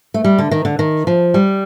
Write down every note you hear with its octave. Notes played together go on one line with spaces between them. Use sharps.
A3
G3
D3
D#3
D3
D#3
F3
G3